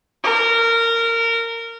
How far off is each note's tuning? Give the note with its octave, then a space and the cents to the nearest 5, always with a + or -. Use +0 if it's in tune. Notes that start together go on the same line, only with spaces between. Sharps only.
A#4 -20